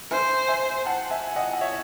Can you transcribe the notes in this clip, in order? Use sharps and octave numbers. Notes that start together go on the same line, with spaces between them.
C5 E5 G#5
E5 G#5
F#5 A5
E5 G#5
G#5
D#5 F#5
F#5
C#5 E5